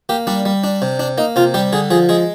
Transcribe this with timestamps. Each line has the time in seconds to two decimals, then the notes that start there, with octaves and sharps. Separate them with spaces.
0.09 A#3 G4
0.27 G3 D4
0.45 G3
0.64 D4
0.82 C3
1.00 D4
1.18 A#3 D#4
1.36 C3 F4
1.54 G3 G4
1.73 D3 G#4
1.91 F3 G#4
2.09 G#3 G#4